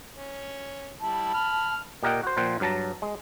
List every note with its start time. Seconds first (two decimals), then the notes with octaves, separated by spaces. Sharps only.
0.16 C#4
1.01 G3 E4 A5
1.34 B5 F6
2.03 A#2 G4 A#4 D#5 F#5 G5
2.23 F#4 C5
2.37 A#2 F3 C5 F#5 G5
2.60 G2 F#3 A5 A#5
3.02 G#3